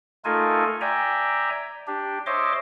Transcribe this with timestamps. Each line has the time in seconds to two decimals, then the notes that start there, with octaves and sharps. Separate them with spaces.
0.25 A3 D#4 F4 A4 A#4 G#5
0.81 D5 E5 G5 G#5 A#5
1.87 D4 G4
2.26 C5 C#5 D#5 E5 C6 D6